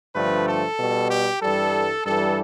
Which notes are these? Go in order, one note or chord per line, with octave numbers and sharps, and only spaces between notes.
G2 D3 F3 A3 B4
A4
B2 G3
G4
G2 E3 G3 A4
G2 E3 G3 A4